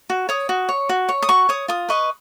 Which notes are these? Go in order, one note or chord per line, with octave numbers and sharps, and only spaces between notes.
F#4
C#5 D#6
F#4
C#5
F#4
C#5
D#6
F#4 C#6
C#5 D#6
F4 D#6
B4 D#5 C#6